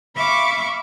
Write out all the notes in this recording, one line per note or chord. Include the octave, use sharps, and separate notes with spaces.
E5 F5 B5 C#6 D6